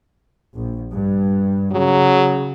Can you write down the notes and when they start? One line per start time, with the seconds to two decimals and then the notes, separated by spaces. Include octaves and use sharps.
0.55 A#1
0.93 G2
1.72 C#3 F#3